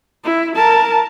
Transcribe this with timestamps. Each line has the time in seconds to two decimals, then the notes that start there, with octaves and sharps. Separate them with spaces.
0.24 E4
0.55 A#4 A5